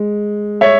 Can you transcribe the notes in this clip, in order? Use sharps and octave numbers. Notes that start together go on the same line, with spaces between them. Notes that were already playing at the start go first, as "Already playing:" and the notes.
Already playing: G#3
C#5 E5